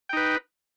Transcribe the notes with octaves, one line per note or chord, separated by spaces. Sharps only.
D#4 B4 G5